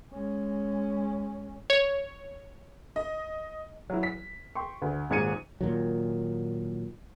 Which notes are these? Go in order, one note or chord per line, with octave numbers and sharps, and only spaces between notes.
G#3 C#4
C#5
D#5
F#3 E4
B6
G5 C6 C#6
D2
D#1 G#2 G#6 C#7 D#7
A#2 D#3 F#3